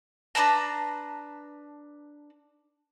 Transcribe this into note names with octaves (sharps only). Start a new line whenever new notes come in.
D4 B4 A5 A#5